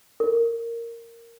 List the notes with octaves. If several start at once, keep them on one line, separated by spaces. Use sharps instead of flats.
A#4